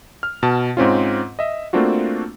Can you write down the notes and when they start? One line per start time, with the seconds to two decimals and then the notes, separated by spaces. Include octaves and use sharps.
0.23 F6
0.43 B2 A5
0.77 G#2 C4 C#4 F4
1.39 D#5 E5
1.73 A3 A#3 C4 D4 F4 F#4